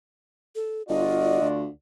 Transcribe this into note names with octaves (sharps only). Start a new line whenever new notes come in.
A4
G1 F4 F#4 D5 D#5
D2